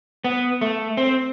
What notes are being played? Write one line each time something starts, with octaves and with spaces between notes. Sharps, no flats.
B3
A3
C4